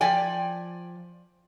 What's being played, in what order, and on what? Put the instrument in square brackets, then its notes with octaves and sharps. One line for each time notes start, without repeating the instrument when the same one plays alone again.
[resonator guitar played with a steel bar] F3 D5 G5 G#5